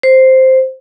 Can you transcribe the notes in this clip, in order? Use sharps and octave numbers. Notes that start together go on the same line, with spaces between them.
C5